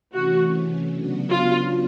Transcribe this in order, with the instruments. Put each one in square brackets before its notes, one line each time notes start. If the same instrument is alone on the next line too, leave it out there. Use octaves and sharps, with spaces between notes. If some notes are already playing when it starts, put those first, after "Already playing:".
[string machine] C3 E3 A3 C#4 [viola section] F#4
[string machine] C#3 F#3 B3 D4 F#4
[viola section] F4